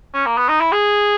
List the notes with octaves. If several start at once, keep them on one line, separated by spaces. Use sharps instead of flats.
C#4
A#3
B3
D#4
E4
G#4